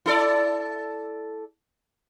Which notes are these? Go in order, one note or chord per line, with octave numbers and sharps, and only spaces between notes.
E4 A4 D5